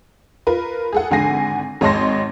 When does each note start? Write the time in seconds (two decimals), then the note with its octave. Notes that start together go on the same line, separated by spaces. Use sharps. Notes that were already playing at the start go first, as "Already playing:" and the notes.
0.47 F4 A#4 B4
0.93 G#4 A4 F#5
1.11 G#1 D3 F#5 G#5 A#6 C7
1.81 G#1 C#5 D#5 A5 C6 A#6